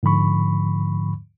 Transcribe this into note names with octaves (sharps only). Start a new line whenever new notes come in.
G#2 D3 F3 B5 C#6